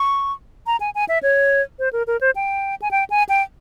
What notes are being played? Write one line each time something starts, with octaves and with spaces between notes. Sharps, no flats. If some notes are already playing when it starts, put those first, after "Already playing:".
Already playing: C#6
A#5
G#5
G#5
E5
C#5
C5
A#4
A#4
C5
G5
G#5
G5
G#5
G5